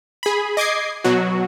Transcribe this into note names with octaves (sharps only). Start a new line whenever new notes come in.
G#4 B5
D#5 D6 G#6 C7
B2 F#3 F#4